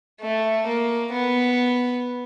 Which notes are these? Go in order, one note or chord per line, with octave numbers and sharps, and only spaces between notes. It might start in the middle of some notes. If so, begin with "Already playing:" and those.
A3
A#3
B3